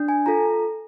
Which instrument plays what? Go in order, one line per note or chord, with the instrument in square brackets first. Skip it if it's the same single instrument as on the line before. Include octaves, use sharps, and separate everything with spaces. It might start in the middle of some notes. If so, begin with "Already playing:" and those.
Already playing: [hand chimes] D4
G#5
F4 A4 A#5